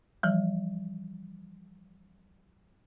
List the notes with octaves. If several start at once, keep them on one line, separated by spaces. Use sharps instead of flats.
E3 F3 G3